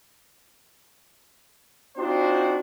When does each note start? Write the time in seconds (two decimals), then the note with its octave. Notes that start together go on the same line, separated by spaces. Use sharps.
1.97 C4 D4 D#4 F4 F#4 C5